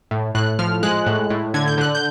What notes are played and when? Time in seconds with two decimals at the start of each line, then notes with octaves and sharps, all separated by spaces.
0.11 A2
0.35 A2 F#6
0.59 F3 F6
0.83 G#3 F#6
1.06 A2
1.30 A2
1.54 D3 G#6
1.67 G6
1.78 D3 F#6
1.95 G6